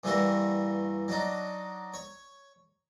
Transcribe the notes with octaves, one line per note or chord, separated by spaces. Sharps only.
G2 E3 G3 A#3 E4 F#4
F#3 D4 D#4
C#5